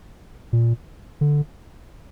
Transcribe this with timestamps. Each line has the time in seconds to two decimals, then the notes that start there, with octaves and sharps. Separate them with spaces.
0.53 A#2
1.21 D3